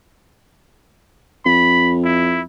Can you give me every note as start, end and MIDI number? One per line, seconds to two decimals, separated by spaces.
1.45 2.46 41
1.45 1.95 83
2.04 2.41 64